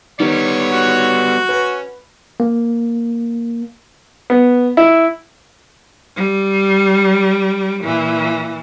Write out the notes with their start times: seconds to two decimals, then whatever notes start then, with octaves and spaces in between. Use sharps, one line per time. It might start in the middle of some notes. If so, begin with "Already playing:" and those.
0.20 D#3 G3 B3 C#5
0.72 F#4
1.49 C#4 B4
2.40 A#3
4.30 B3
4.77 E4
6.16 G3
7.82 A#2 E3